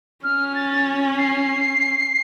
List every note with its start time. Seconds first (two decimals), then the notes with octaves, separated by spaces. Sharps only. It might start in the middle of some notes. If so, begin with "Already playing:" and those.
0.24 C#4 F6
0.55 A6
1.18 C7